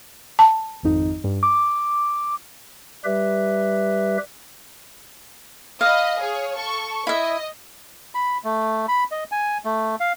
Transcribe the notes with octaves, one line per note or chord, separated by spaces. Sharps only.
A5
G#1 F2 D#4
G2
D6
G3 G4 B4 E5
D#5 F5 B5
G#4 C#5
A4 C#6
E4 D#5 E5
B5
A3
B5
D#5
G#5
A3
F5